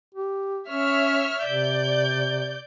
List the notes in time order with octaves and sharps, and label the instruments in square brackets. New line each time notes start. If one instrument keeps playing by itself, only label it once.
[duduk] G4
[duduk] C#4 [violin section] C#5 E5 F6
[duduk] C3 [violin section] D5 G6